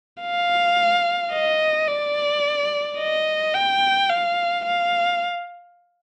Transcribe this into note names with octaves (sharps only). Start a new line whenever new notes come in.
F5
D#5
D5
D#5
G5
F5
F5